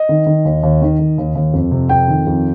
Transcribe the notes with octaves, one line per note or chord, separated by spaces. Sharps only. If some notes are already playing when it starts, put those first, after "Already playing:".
Already playing: D#5
D#3
D#3
D#2
D#2
D#3
D#3
D#2
D#2
F2
C3
F2 G5
D#3
F2